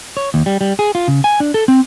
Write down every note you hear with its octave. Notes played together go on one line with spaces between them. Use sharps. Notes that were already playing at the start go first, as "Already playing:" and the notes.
C#5
D#2
G3
G3
G#4
F4
C#3
G#5
D4
A4
C4